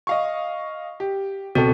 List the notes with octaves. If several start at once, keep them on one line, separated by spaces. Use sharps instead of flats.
D#5 F5 C#6
G4
C#2 B2 C4 F#4 A4